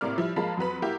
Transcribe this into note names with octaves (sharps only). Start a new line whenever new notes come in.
A2 C3 A#3 D5 F6
F3 G3 E4
F3 G#3 A#3 F5 A5 B5
F2 F#3 B4 B5
A#3 E4 F#4 G4